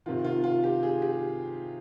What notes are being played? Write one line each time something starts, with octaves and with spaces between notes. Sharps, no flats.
C3 D#3 F4
F4
F4
G4
G#4
G4